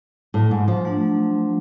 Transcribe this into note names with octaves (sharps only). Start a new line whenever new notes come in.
A2
G#2
F3
F#3 A3 D4